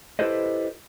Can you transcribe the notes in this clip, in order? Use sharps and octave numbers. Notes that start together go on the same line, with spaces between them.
E4 G4 A4 B4 C5 D#5